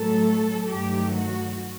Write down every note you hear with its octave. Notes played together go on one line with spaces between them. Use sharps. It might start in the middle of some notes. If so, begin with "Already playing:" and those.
Already playing: A2 F#3 A3 A4
G2 D#3 F#3 A3 G4
F#4